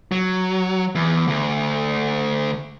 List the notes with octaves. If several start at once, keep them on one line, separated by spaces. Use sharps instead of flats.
F#3
E2
D2